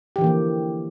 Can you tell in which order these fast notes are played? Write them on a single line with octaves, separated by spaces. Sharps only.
G4 E3 D3 A#3 F3